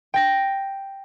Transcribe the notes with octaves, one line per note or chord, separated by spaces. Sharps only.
G5 A#6